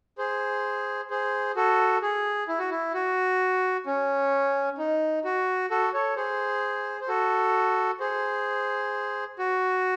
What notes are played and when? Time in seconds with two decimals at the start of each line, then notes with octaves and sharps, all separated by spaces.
0.18 G#4 C5
1.10 G#4 C5
1.56 F#4 A4
2.02 G#4
2.48 E4
2.59 F#4
2.71 E4
2.94 F#4
3.86 C#4
4.78 D#4
5.25 F#4
5.70 F#4 A4
5.93 A4 C#5
6.16 G#4 C5
7.01 C5
7.08 F#4 A4
8.00 G#4 C5
9.39 F#4